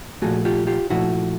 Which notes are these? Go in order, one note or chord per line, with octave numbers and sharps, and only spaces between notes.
A#2 F3 A3 F#4 G#4
F4 G4
F4 G4
A#2 F3 A3 E4 F#4